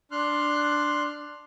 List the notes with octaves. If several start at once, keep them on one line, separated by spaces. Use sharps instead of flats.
D4 C6 F6 F#6